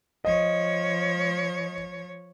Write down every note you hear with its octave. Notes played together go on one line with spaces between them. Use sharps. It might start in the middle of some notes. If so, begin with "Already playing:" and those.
F3 C#5 D#5